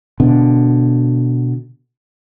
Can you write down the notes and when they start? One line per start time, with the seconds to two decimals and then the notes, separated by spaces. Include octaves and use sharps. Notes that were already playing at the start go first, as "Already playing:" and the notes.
0.20 B2 D3